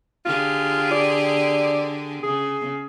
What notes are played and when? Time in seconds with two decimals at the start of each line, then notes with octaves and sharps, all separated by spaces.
0.25 D3 F4 G4 G#4
0.91 D5
2.23 C#3 G#4